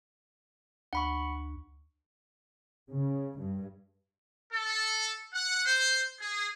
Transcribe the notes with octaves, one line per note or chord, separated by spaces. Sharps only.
D2 F#5 B5 C#6
C#3
G2
A4
F#5
C5
G#4